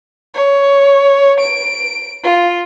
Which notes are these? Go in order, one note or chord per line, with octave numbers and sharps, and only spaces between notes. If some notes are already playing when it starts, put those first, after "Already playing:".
C#5
D7
F4